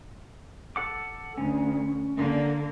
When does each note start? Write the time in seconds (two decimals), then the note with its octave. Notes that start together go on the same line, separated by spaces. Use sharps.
0.76 A4 F#5 D6
1.37 D2 C#4
2.16 D3 A#3